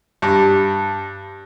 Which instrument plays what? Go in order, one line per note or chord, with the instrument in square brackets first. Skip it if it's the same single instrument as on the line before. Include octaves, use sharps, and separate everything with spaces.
[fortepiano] G2